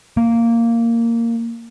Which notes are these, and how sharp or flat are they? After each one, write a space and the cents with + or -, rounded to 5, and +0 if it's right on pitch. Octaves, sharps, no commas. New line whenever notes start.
A#3 -10